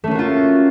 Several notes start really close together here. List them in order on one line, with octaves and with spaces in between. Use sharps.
A3 C#4 A#3 F#4 F4